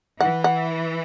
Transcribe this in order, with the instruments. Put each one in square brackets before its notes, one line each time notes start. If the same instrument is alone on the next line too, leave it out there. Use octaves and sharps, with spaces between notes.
[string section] E3 [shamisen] F#5
[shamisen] F#5